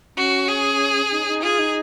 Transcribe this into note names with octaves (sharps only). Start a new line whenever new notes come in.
C#4 F#4
G#4
D#4
D#4
F4 G#4
D#4